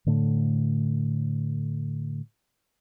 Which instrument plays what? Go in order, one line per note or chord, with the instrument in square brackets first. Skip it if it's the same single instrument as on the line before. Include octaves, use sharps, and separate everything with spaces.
[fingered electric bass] A2 D3 A3